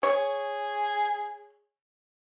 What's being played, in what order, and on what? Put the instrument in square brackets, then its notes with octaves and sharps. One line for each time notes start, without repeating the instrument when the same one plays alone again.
[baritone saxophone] G#4 [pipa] C#5